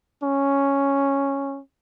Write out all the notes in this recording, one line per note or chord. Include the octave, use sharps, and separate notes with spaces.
C#4